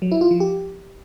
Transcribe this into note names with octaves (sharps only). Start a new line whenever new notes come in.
F#3
E4
F4
F3
G4